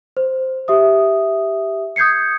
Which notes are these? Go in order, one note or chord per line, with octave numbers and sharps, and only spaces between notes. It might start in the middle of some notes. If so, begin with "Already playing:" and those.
C5
G4 E5 D#6
D#6 G6 G#6 C7 C#7